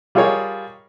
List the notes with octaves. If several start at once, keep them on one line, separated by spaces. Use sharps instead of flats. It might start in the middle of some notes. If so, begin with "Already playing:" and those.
G3 F4 G#4 A#4 C#5 D#5